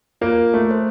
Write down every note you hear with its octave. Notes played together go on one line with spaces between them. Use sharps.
A#3 F4
A3
A4 C5